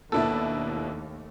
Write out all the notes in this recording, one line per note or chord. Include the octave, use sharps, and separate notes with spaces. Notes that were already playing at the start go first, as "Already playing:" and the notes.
D#2 B2 A3 D4 E4 A4